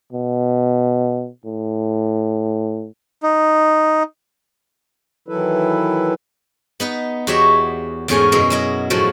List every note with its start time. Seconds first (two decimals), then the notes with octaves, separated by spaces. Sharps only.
0.13 B2
1.45 A2
3.23 D#4
5.28 D#3 E3 F#3 E4 A4 B4
6.80 B3 D#4 B4
7.27 E2 F#4 G4 C#5 D#5 E5
8.08 E2 G#2 A3 C#4 A#4 G#5
8.32 F#2 B2 G#3 E4 D#5
8.50 F#3 E4 D#5
8.90 E2 A2 F3 F#3 F#4